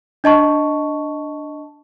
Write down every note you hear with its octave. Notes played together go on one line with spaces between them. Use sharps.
D4 D#5 A5 C#6